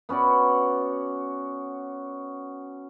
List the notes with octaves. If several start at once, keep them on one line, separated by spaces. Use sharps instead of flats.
B3 C#4 F#4 D5